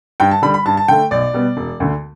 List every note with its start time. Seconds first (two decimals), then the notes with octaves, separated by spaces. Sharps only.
0.20 G2 G5
0.31 A5
0.42 D3 G3 B5
0.54 B5
0.65 G2 A5
0.77 A5
0.88 D3 A3 G5
1.11 B1 D5
1.34 B2 G3 B3
1.57 E1
1.80 D2 D3